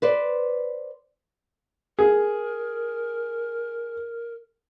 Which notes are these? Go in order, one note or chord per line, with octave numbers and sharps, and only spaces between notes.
B4 C5 D5
G#4 A#4